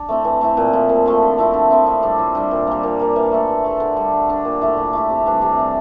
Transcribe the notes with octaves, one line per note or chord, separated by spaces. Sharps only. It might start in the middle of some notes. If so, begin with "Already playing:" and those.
Already playing: D4
A3 C4 E4
E3
A3 C4 E4
A#2
F3 A3 E4
A#2
F3 A3 E4
D3
F3 C4 E4
D3
F3 C4 E4
A2
G3 D4
A2
G3 D4
A#2
G3 A#3
A#2
G3 A#3
E3
A3 E4 A4
E3
A3 E4 A4
D3
G3 D4
D3
G3 D4
A#2
A3 E4 G4
A#2
A3 E4 G4
C3
E3 G3 D4
C3
E3 G3 D4